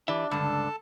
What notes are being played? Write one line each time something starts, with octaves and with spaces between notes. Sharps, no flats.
E3 D4 G4 D5 E5
C#2 G2 D3 A4 A5